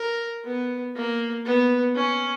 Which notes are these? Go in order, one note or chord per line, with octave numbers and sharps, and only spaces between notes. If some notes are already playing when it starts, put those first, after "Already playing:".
Already playing: A#4
B3
A#3
B3
C#4